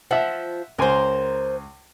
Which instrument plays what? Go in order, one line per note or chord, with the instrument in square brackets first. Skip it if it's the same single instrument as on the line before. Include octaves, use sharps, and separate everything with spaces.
[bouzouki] F3 [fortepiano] E5 F#5
[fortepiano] C#2 G#5 C6 [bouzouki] A#4 C5